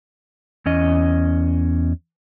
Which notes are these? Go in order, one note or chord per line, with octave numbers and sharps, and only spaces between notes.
E2 C#4 D#5